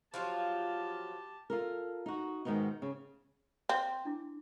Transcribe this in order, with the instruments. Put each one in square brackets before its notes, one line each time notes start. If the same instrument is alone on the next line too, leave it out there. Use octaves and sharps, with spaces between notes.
[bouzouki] F3 F#3 F4 [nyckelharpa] G4 A5
[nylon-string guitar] F4 A4 A#4
D#4 F#4
G#2 B2 D#3 B3 D#4
C#3
[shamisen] C4
[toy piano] D4 E4 D6